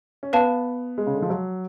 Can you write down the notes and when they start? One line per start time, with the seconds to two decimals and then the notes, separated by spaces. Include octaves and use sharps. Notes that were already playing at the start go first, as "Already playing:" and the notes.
0.23 C#4
0.33 B3 B4 F5 A5
0.98 G#3
1.07 C#3
1.14 D3
1.22 F3
1.30 F#3